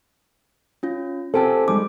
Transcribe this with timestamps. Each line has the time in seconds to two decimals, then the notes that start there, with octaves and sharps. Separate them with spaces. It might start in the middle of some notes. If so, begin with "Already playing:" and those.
0.83 C#4 F4
1.34 C4 F4 G4 A4 C5 G#5 A5
1.68 G3 G#3 D#4 D6